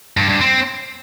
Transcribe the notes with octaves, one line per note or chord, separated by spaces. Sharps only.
G2
G2
C4